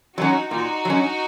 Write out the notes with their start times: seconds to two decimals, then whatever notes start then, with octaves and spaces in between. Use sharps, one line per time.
0.18 F#3 C#4 D#4 F#4
0.51 A#2 D#4 F#4
0.85 F#3 C#4